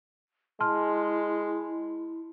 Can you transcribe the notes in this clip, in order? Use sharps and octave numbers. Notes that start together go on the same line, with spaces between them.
G#3 E4 A5 C6 F6